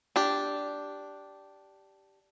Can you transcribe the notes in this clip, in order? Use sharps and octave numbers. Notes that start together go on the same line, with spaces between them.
D4 G4